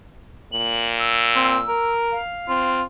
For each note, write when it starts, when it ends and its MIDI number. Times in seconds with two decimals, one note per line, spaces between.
0.52 1.77 46
0.52 0.88 102
0.99 1.92 88
1.35 1.58 60
1.68 2.17 70
2.12 2.78 77
2.48 2.83 60
2.48 2.83 65